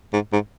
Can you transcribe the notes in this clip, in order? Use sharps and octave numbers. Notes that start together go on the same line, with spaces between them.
G#2
G#2